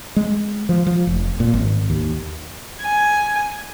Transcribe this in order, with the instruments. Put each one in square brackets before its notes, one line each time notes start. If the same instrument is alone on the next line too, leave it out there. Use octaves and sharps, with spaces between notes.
[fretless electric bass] G#3
F3
F3
F1
A#2
G#1
D#2
[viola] G#5